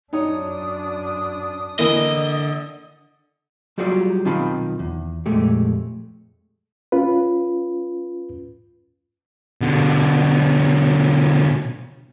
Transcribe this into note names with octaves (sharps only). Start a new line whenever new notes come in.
F#2 D4 D#4 C#5 D#6
D3 E3 A#3 E4 D#5
F#3 G3 F4 F#4 G#4 D5
B1 D#3 C4 F4 A5 B5
E2
F2 A#2 G#3 A3 G4
C#4 F4 B4
B2 D3